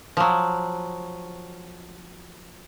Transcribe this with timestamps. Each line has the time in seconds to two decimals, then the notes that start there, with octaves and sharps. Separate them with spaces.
0.17 F3 F#3